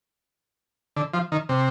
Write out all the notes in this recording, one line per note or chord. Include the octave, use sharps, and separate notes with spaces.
D3
F3
D#3
C3